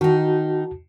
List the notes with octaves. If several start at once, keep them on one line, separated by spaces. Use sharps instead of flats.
D#3 D#4 F#4 A5